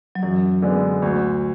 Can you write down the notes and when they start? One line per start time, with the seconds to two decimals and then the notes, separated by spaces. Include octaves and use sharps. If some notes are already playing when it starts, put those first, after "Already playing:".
0.15 F#3
0.23 F#2 E3
0.62 D3 G#3 B3
1.02 D2